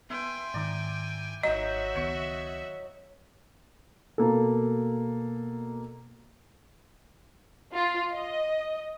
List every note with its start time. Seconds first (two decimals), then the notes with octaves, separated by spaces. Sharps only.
0.10 B3 E4 B4 G5 G#5 C6
0.54 G#2 D#3 D5 A#5
1.43 G#1 F#3 D#4 F#4 D#5 E5 A#5
1.95 C#2 D#3 B3 C#5 C#6
4.18 B2 A#3 A4
7.73 F4
8.13 D#5